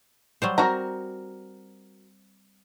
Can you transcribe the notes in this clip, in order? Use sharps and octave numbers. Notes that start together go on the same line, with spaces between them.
F#3 G3 C5
C4 F#4 A#4 A#5